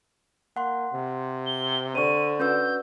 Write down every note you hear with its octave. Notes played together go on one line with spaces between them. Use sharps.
A#3 F#5 C6
C3
G7
D3 C5 C#6 D#7
C#4 F#4 B4 E6 G6